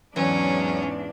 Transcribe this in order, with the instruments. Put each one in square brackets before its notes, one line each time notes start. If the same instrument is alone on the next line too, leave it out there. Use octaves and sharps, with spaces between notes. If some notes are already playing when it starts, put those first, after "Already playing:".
[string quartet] E2 G#2 D4 [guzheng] E3 [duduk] F#3 [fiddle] C#4